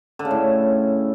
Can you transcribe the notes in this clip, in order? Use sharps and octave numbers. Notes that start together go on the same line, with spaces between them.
D3
C#3
A2